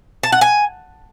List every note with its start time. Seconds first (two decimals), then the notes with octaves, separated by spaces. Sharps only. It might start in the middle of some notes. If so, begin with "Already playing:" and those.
0.23 A5
0.32 F#5
0.41 G#5